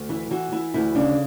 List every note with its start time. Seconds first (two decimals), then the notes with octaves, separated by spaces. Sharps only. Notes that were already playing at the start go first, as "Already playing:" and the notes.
Already playing: D2
0.09 E3 E4
0.31 E3 F#4
0.52 E3 E4
0.74 D2 E4
0.95 C#3 D4